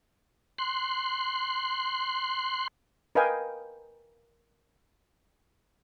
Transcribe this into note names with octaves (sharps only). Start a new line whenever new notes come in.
C6 F#6
A#4 B4 D#5 F5 G5 G#5